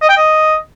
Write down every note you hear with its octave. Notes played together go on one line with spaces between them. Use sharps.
D#5
G5
D#5